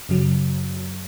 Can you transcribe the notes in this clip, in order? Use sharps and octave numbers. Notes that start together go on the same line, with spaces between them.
F#2 C#3 F#3